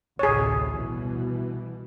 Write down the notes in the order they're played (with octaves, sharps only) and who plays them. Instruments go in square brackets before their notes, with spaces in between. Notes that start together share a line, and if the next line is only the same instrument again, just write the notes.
[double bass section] A1 D2 C3 [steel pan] G#4 C#5
[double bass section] C2 B2 E3